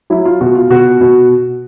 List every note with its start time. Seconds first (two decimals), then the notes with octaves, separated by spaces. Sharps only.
0.10 F#3 E4
0.25 F4
0.41 B2 F#4
0.55 F4
0.70 B2 F#4
1.01 B2